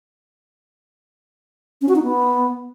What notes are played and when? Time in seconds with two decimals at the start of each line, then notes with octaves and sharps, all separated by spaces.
1.82 C#4
1.89 F#4
1.96 D#4
2.03 B3